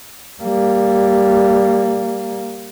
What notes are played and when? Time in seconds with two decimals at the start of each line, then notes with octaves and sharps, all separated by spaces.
0.42 G3 A#3